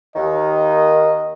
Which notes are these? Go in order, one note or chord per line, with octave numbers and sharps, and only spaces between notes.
D#2 D#3 D#5